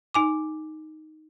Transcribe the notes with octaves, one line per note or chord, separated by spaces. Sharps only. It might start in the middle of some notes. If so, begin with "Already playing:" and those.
D#4 G#5 D6